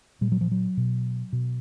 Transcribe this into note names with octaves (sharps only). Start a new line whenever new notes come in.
A#2 G3
F#3
F3
F#3
B2
B2